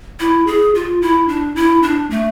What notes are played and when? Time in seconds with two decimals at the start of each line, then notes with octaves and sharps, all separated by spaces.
0.20 E4
0.47 G#4
0.75 F4
1.02 E4
1.28 D4
1.56 E4
1.83 D4
2.10 A3